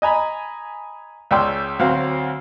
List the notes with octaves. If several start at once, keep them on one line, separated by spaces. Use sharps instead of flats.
D#5 G#5 A#5 B5
C#2 C#3 D5 G5 C6 E6
D2 F#3 C4 F5